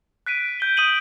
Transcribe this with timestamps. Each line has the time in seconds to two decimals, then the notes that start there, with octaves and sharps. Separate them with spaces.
0.26 F#6 B6 D7 D#7
0.60 G6 G7
0.77 D#6 D7 D#7 F#7